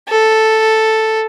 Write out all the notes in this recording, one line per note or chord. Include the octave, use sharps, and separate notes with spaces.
A4